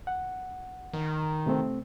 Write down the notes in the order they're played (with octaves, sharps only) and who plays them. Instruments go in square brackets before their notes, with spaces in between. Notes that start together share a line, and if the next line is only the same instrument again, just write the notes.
[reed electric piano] F#5
[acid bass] D#3
[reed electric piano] C3 A3 C4